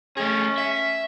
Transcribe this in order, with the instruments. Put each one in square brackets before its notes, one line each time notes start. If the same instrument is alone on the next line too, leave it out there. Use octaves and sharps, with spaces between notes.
[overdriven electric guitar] A3 G#4 [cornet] C#4
[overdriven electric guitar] E5